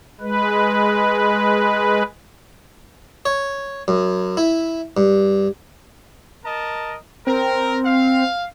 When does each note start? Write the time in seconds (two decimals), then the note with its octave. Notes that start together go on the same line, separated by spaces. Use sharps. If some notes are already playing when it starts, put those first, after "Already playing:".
0.21 G#3 B4
3.25 C#5
3.88 F#2
4.37 E4
4.97 G2
6.45 A#4 D#5 A5
7.27 C4 A#4
7.86 F5